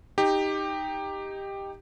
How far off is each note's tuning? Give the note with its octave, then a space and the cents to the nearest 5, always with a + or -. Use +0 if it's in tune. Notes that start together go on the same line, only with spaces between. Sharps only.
D#4 +0 G4 +10